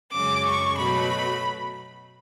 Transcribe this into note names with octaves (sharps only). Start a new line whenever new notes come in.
F#2 C#3 G#3 C#4 D6
C#6
B2 F#3 A3 B5